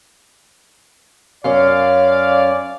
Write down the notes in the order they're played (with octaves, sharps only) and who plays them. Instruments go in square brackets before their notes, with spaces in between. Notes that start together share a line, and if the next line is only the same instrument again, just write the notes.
[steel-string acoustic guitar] F#2 C#4 [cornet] D5 [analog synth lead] F5